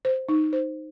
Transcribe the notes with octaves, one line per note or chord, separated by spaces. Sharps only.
C5
D#4
C5